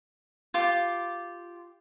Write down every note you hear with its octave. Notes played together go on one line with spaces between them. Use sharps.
F4 G4 D6